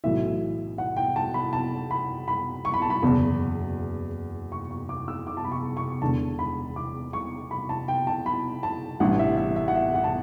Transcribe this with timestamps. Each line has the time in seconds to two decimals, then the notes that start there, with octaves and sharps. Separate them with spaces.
0.04 B1 A2 E3 E5
0.78 F#5
0.96 G5
1.16 A5
1.34 B5
1.53 A5
1.91 B5
2.28 B5
2.65 C#6
2.74 B5
2.82 A5
2.90 B5
3.02 F#1 E2 B2
4.52 C#6
4.71 C#6
4.89 D6
5.08 E6
5.27 D6
5.37 A5
5.45 B5
5.52 C#6
5.77 C#6
6.02 E1 E2 D3 A5
6.39 B5
6.76 D6
7.13 C#6
7.51 B5
7.69 A5
7.88 G5
8.07 A5
8.26 B5
8.63 A5
9.00 A1 G2 E3 F#5
9.19 E5
9.37 E5
9.56 E5
9.68 F#5
9.75 E5
9.94 F#5
10.04 A5